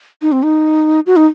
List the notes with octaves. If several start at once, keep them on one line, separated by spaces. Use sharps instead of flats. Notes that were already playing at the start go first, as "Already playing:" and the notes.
D#4
C4
D#4
F#4
D#4